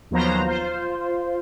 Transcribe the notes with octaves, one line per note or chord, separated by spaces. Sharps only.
D#2 F3 F#3 B3 C5 A#5
F4 C5